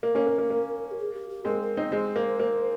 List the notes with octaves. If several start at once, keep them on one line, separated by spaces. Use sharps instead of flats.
A#3 A#4
A#3 C#4
A#3
A#3
A#3
G4
G#4
G4
G4
G#3 C4 A#4
A#4
C4 D#4 C5
G#3 C4
A#3
A#3